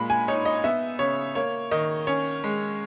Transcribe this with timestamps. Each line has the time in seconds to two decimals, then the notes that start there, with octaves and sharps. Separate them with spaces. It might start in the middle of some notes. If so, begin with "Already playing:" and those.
Already playing: A#2 G#3 B5
0.10 G#5
0.28 D#4 C#5
0.45 D#5
0.64 B3 E5
0.99 C#3 C#5
1.35 A#3 C#5
1.71 D#3 D#5
2.07 C#4 C#5
2.44 G#3